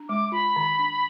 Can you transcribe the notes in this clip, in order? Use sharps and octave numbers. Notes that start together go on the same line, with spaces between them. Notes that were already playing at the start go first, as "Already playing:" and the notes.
Already playing: D4
G#3 D6
F4 B5
D#3
D4